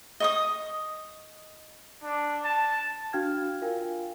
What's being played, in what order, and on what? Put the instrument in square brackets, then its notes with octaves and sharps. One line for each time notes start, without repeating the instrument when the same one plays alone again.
[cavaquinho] D#5 C#6 D#6
[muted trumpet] D4
A5
[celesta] D4 F#4 F5 G5 F6 G#6
F4 A#4 F5 G5 G#5